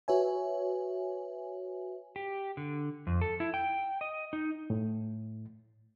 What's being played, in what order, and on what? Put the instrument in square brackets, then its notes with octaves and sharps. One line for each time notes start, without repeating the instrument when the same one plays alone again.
[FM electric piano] F#4 B4 C#5 E5 G#5
[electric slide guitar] G4
D3
F2
A4
E4
G5
D#5
D#4
[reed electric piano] A2